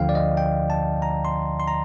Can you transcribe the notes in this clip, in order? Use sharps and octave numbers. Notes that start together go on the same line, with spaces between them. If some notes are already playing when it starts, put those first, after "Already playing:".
Already playing: D2 D3 F3 F5 G5
D5
D#5
G5
A5
A#5
C6
C6
A#5